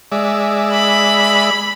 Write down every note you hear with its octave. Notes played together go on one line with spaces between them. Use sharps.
G#3 D5 E5
B5